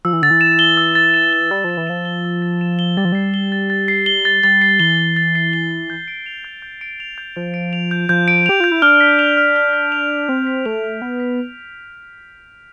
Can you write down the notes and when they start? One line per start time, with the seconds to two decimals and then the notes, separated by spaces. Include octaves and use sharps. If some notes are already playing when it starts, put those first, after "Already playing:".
0.05 F3 E6
0.13 E3
0.22 D3 A6
0.31 E3
0.41 E7
0.59 G7
0.77 E6
0.95 A6
1.14 E7
1.33 G7
1.51 G3 E6
1.64 F3
1.70 A6
1.77 E3
1.87 F3 E7
2.05 G7
2.25 E6
2.42 A6
2.61 E7
2.79 G7
2.97 G3 A6
3.05 F3
3.12 G3 C7
3.34 G7
3.52 A6
3.70 A6
3.88 C7
4.06 G7
4.25 A6
4.43 G3 A6
4.62 C7
4.80 E3 G7
4.98 A6
5.16 A6
5.35 C7
5.53 G7
5.71 A6
5.90 G6
6.08 D7
6.26 F7
6.44 G6
6.62 G6
6.81 D7
7.00 F7
7.18 G6
7.36 F3 G6
7.54 D7
7.73 F7
7.91 G6
8.09 F3 G6
8.28 D7
8.46 G4 F7
8.60 F4 G6
8.71 E4
8.82 D4 F6
9.01 B6
9.19 F7
9.37 F6
9.56 F6
9.73 B6
9.92 F7
10.10 F6
10.29 C4 F6
10.47 B6
10.65 A3 F7
10.84 F6
11.02 B3 F6
11.20 B6